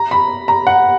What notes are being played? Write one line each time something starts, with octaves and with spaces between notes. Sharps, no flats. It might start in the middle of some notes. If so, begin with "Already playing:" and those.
Already playing: A#5
B5
A#5
F#5